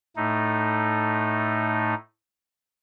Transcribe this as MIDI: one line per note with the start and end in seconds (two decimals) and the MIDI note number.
0.16 1.94 45
0.16 1.94 57
0.16 1.94 63